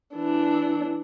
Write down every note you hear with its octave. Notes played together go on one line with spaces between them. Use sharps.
E3 D4